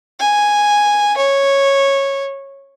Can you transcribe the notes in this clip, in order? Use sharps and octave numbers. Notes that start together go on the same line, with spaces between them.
G#5
C#5